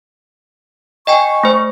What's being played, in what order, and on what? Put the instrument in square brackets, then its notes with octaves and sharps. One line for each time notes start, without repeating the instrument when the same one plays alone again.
[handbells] D#5 G5 G#5 [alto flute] C#6
[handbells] A3 C5